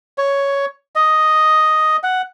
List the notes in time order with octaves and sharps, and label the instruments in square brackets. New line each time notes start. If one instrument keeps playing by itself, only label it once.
[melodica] C#5
D#5
F#5